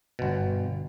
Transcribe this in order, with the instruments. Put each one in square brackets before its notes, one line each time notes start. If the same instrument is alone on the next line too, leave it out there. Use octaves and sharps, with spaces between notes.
[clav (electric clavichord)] G1 B2